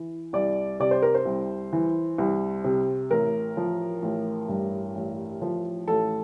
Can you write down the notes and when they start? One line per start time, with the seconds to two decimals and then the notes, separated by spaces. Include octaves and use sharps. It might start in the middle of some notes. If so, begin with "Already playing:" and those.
Already playing: E3
0.33 C2 D5
0.80 C3 D5
0.91 C5
1.02 A#4
1.15 C5
1.25 C2
1.73 E3
2.18 C2
2.64 C3
3.10 A1 A#4
3.57 F3
4.02 A1
4.49 G2
4.95 A1
5.42 F3
5.88 A1 A4